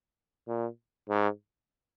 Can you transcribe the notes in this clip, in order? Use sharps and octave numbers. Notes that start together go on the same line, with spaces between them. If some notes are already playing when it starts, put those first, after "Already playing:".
A#2
G#2